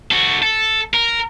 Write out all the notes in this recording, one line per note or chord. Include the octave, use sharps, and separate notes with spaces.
F#4 A4
A4
A#4